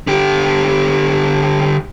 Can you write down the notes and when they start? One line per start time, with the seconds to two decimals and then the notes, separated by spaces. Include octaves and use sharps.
0.07 D3 G4